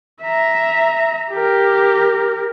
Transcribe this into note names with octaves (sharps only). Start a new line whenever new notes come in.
E5 A#5
G4 A#4